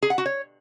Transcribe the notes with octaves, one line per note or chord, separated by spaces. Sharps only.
G#4
F#5
F#4
C#5